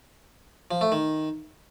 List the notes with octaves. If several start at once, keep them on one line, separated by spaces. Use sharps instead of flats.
F3
A3
D#3